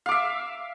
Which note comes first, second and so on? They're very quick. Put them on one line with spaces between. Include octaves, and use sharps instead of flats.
F5 D6 E5